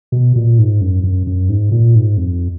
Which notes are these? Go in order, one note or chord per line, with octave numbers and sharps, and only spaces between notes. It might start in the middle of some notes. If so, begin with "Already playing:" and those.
B2
A#2
G#2
F#2
F#2
F#2
G#2
A#2
G#2
F2